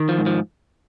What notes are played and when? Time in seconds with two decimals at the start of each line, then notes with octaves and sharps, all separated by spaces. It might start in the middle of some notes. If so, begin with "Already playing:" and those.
Already playing: D#3
0.09 F3
0.18 G#2
0.26 F3